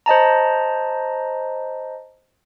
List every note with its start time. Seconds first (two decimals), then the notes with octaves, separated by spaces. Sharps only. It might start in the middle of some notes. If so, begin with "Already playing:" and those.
0.06 C5 D#5 A5 A#5